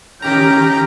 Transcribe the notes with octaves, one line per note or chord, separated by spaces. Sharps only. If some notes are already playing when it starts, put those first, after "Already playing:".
D#3 C#4 G4 A#4 G5 A#5